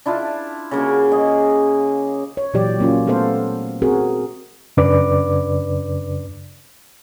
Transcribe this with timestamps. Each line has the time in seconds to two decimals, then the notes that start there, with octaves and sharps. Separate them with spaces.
0.06 D4 E4 F4 A5
0.71 C#3 A#3 F#4
1.12 G#4 D#5
2.37 C#5
2.54 A#2 E3 F#3 G4 D5
2.79 F#3 A#3 C#4 F4
3.07 A3 B3 A4 C5 F5
3.82 C4 F#4 G#4 A#4
4.77 F#2 C#3 D4 B4 D5 D6